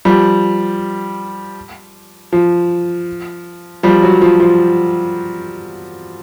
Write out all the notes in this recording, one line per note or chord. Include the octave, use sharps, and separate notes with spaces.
F3 G3
F3
F3 G3
F#3
F3
F3